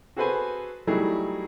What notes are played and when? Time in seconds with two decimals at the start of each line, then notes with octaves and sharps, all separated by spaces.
0.16 F#4 G#4 A4 B4 C5 G#5
0.87 F#3 G3 A3 D#4 E4 G#4